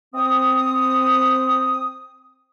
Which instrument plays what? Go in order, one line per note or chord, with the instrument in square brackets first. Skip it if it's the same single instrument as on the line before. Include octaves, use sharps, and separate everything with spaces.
[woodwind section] C4 D#6